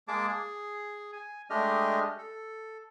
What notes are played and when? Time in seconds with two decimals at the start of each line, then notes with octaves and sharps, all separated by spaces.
0.08 G#3 A#3 G#4 A5 D6
0.28 G#4
1.13 G#5
1.50 G#3 A3 D4 G4 D#5 F6
2.18 A4